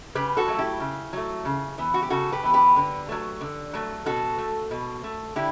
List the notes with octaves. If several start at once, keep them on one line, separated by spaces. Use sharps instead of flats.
C#3 G4 B4
F#4 A4
F#3 A3
E4 G4
C#3
F#3 A3
C#3
E3 B3
F#4
G4
C#3 F#4 A4
G4 B4
E3 B3
G4 B4
D3
F#3 A3
D3
F#3 A3
B2 F#4 A4
A3
B2
A3
D3 E4 G4